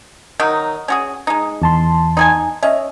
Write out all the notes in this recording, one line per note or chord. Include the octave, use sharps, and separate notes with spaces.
D#3 F#3 D#4
C#4 F#4 G#4
G#3 D#4
E2 A5 C6
D#4 G#4 G#5
C#4 D#5 E5